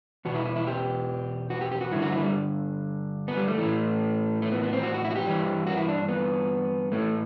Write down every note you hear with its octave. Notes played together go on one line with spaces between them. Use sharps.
E2 B2 F#4
E4
E4
E4
G4
F#4
G4
G4
F#4
G2 D3 E4
F#4
E4
G3
B3
G3
A3
A2 E3
A3
B3
B3
C4
F#4
F#4
E4
F#4
G4
G2 E3
F#4
E4
D4
B3
A2 E3 A3